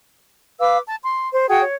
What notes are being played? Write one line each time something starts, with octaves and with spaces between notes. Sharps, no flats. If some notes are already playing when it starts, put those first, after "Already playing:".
B4 F5 D6 E6
A5
C6
C5
F#4 G#4 F#5 G5
C#5